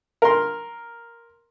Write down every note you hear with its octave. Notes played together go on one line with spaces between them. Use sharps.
A#4 C6